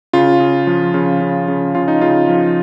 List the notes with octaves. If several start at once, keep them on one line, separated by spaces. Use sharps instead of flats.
C#3 F4
C#3
F3
C#3
C#3
C#3
C#3 F4
D#4
C#3 F4
F3